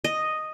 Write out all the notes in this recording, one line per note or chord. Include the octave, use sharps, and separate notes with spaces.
D#5